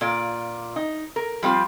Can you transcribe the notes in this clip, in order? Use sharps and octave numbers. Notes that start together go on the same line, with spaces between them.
A#2 F4 D5
D#4
A#4
F3 G3 C4 F4